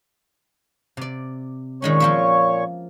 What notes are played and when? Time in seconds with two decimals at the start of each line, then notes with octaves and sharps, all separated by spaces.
0.97 C3 D5
1.82 A#2 D#3 G#3 C#4 C#5 C#6
2.00 F3 A#3 E5